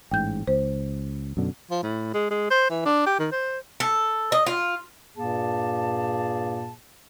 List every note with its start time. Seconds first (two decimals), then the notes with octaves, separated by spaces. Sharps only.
0.11 A1 G#2 G5 G6
0.47 C#2 C5
1.37 F#2 B2 D3
1.71 F3
1.83 A2
2.14 G#3
2.31 G#3
2.51 C5
2.70 E3
2.85 D4
3.06 G4
3.19 D#3
3.32 C5
3.80 A4
4.32 D#5
4.47 F4
5.17 G2 A#2 A#3 G#4 A5